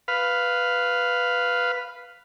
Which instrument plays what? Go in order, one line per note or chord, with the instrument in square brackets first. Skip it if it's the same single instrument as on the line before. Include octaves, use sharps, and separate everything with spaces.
[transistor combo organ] B4 F5